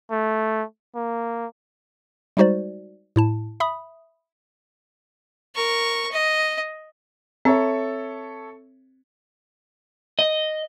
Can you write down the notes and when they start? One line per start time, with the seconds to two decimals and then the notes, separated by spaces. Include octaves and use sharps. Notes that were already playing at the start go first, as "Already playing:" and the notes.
0.11 A3
0.95 A#3
2.37 G3 G#3 D#4 F#4 C5 D5
3.16 A2 E4 A5
3.60 E5 B5 D#6
5.55 A#4 C#6
6.11 D#5
7.45 C4 A4 C#5 E5
10.19 D#5